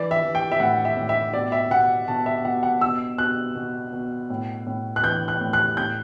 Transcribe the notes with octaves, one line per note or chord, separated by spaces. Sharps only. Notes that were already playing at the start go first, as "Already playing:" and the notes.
Already playing: E3 D5
E5
E3
G5
E5
A2 F#5
E5
A2
E5
B2 D5
E5
B2 F#5
B2 A5
E5
B2 F#5
F#5
B2 E6
B2 F#6
B2
B2
A2
A2
F#6
E3 G6
F#6
A2
F#6
A2 G6